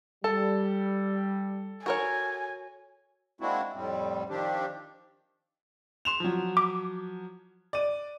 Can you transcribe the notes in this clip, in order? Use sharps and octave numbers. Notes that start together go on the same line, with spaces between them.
G3 A4 A5
F#4 A#4 C#5 G#5
G#3 A#3 C4 D4 E4 F#4
F2 A2 G3 C4
D#3 F3 C4 D4 G4
C6 E7 F7
F3 F#3
D6
D5 D#7